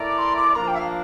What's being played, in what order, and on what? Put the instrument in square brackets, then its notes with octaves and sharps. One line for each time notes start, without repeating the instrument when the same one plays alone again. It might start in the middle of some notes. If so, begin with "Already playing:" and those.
Already playing: [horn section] A3 E4 A#4 D5
[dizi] D6
C6
D6
[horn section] F3 A#3 D4 [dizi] A#5
[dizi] G5
E5
F5